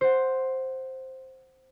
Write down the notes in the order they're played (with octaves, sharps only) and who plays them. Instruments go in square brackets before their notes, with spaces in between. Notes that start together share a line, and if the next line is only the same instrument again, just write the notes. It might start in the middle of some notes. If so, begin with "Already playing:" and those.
[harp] C5 F#5